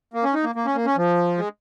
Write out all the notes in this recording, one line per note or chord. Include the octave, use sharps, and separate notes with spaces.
A#3
C#4
D#4
A#3
A#3
C#4
A#3
C#4
F3
G#3